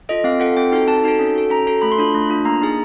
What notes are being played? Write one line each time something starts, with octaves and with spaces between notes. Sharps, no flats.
F4 A4 D#5
C4 F5
F4 A4 F#5
C4 G5
D#4 F#4 A4
C4 A5
D#4 F#4 A4
C#4
F#4 A4
C#4 A#5
F#4 A4
A3 B5
C6
D4 F4 B5
A3
D4 F4
A#3 A#5
D#4 G#4